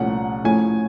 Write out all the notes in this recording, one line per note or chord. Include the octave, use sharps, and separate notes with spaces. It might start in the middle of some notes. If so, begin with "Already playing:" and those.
Already playing: C2 A#2 F3 A3 C#4 F#5
A2 F3 A3 C#4 G#5